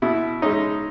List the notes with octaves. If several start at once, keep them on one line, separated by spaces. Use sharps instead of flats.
B2 E4
G#3 C#4 D#4